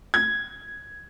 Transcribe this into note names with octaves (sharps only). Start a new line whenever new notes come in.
G#6